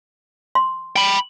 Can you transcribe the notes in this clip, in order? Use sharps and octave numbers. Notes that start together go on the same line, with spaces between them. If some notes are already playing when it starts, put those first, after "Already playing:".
C6
G5 B5